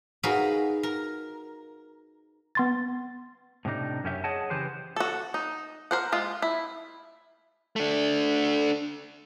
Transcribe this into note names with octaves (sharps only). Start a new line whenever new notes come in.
D#4 F#4 G#4 A#4 B4 F5
A#4
B3 C6 A6
A2 C3 D4 D#4
F#2 C#4 G4 E5
G#4 C#5 D#5 F#5 A5
C#3 E3 G4 B4 C5
F#4 A4
D#4
A#4 C5 F#5
G#3 F4
E4
A3 D4